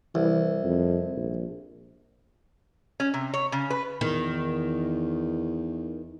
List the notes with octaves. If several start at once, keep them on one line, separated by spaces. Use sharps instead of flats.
C2 E3
F2
A#1
C#4
C3
C#5
C#3
B4
E2 D#3